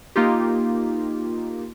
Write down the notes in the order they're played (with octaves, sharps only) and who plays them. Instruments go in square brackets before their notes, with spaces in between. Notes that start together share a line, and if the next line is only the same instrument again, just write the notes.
[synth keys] A#3 D#4 F4 G4